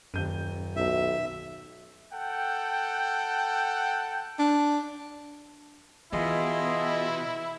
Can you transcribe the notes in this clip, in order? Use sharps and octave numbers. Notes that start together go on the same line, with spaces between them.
D#1 F#2 G6 D#7
B1 E5
A4 F#5 G5
D4
B2 E3 E4 F4 G#4 D#5